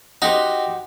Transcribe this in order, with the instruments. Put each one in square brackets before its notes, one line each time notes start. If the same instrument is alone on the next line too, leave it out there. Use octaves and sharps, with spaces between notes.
[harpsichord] D#4 [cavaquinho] F#4 G4 C5